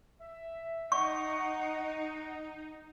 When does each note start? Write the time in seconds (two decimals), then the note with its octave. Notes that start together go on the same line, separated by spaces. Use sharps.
0.21 E5
0.92 D#4 D#5 F#5 C#6